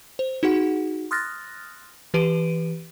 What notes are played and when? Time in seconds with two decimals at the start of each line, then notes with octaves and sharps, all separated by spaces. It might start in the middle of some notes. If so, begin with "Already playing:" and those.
0.19 C5
0.43 D#4 F#4 G#4 F#5
1.11 C6 D#6 F6 F#6 A6 A#6
2.14 E3 G4 B4 D7 D#7